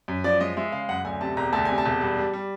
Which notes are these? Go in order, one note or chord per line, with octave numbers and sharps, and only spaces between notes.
F#2
F3 D5
G#3 D#5
G#3 E5
C#3 F5
F#2 F#5
D2 G#5
C3 A5
E1 A#5
D2 A5
C3 G#5
A5
E1
G2
G3
G3